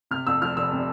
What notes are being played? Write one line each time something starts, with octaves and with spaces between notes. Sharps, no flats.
C3 F6
F2 E6
F3 F6
F1 E6
C3